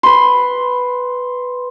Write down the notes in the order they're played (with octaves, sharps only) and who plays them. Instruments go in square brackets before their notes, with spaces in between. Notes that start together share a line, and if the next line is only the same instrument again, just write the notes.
[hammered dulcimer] B4 C6